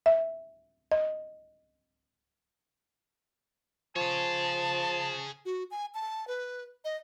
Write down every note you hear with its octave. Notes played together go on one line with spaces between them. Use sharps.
E5
D#5
F3 G#4 C#5 A5
F#4
G#5
A5
B4
D#5